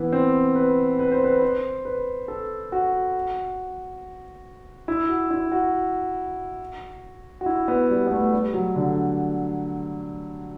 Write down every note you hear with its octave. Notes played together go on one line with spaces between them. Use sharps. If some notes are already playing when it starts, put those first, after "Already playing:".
Already playing: E3 B3
C4
B4
B4
C5
B4
C5
B4
A4
F#4
E4
F#4
E4
F#4
F#4
E4
B3
G3
B3
A3
G3
F#3
D3